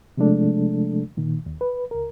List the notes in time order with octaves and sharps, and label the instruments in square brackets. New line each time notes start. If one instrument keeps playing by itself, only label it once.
[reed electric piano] C3 F3 G#3 A3 D4 A4
A#2 D#3
D#2
B4
C#2 A#4